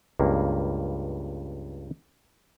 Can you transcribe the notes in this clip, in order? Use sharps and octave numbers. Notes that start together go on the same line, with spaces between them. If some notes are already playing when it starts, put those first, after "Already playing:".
C#2 G2 A#3